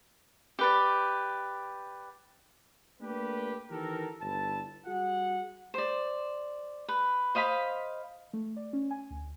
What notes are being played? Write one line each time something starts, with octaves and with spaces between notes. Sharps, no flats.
G4 B4 D5
A3 A#3 D4 G4 B4
D#3 E3 G4 A4 A#4
G1 E4 A5
G3 F#4 G#4 F#5
C5 D5
B4
C5 D#5 F5 B5
A3
D5
C#4
G#5
D2